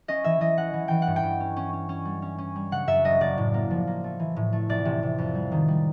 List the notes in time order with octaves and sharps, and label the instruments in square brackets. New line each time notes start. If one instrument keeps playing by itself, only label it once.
[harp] C#4 D#5
E3 E5
E3 D#5
C#4 F#5
E3
E3 G5
F#5
G2
G5
G2
C#4
C#4
C#4
C#4
G3
C#4
C#4
G3
C#3 F#5
F#2 E5
F#1 D#5
F#1 D5
A2
A#3
F3
A#3
A3
E3
A2
A3
F1 D5
C3
C3
F2
G3
D#3
G3